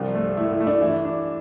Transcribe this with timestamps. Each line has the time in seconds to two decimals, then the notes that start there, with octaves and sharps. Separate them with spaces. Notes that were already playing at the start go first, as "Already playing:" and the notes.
Already playing: C2 F3 D4
0.14 A3
0.37 A3 E4
0.53 E4
0.60 A3
0.67 D4
0.82 E3 E4
1.04 D4